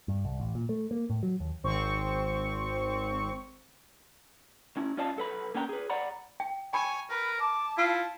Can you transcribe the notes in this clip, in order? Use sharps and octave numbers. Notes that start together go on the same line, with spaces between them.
G2
C2
A1
A#2
A3
A#3
A2
F#3
D#2
G#1 C4 C#6
C#4 E4
C#4 F4 D5 D#5 F5 A5
B1 A4 B4 B5
A#3 C#4 D4 G5 A5 A#5
G#4 B4
D5 F#5 A#5 B5
G5
C#5 G5 G#5 B5 E6
A#4 B4
A5 D6
E4 F4